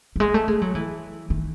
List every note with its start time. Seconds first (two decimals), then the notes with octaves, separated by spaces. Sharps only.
0.16 F#3
0.20 G#3
0.34 A3
0.48 G#3
0.62 F#3
0.75 E3
1.30 D#3